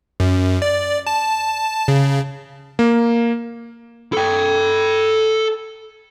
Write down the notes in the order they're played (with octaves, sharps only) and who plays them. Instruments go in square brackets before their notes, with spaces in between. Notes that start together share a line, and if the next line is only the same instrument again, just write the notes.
[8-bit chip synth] F#2
D5
A5
C#3
[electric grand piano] A#3
[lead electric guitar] A4 G5